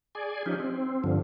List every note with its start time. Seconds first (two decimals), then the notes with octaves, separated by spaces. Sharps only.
0.15 G#4 D5 G#5
0.46 F3 C#4 D#4 G4
0.60 C4
1.04 G2 D3 F3